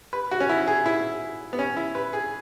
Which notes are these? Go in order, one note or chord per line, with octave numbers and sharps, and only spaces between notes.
B4
F#4
C#4
E4
G#4
E4
B3
C#4
E4
B4
G#4